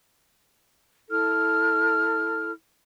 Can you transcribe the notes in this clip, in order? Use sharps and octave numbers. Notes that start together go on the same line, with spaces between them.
E4 A4 F6